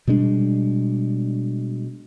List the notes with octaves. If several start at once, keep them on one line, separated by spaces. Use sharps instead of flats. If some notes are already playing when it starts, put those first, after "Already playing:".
B2 G3 G#3 D4